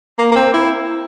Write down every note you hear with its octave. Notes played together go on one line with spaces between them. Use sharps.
A#3
A#3
C4
E4